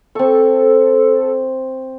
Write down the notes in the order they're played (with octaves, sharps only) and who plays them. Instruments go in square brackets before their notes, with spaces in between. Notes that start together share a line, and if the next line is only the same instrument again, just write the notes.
[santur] C4 C#6 [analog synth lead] A4